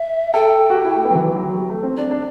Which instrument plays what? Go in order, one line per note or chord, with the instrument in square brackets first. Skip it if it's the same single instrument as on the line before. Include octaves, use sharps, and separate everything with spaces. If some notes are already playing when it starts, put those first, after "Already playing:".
Already playing: [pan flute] E5
[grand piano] A4 [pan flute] G5
[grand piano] F#4
G4
E4
A3
B3
F#3
E3
F#3
G3
A3
C4
[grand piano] D4 [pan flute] D5
[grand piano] D4